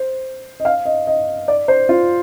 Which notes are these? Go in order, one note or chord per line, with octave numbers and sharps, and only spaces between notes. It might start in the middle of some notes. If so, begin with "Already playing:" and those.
Already playing: C5
D#5
F5
D#5
D#5
D5
C5
F4